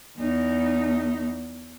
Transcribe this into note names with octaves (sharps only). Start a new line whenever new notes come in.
E2 D#4